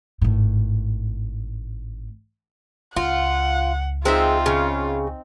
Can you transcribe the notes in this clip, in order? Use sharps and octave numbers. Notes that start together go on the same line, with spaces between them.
G#1 A2
C#2 F4 F#5
G#3 C4 D#4 F4 E5
C#3